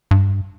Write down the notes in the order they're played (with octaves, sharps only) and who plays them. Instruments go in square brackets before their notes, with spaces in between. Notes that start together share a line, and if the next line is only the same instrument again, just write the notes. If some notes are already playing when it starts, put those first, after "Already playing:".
[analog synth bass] G2